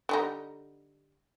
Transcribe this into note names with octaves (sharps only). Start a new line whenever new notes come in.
D3 G3 D#4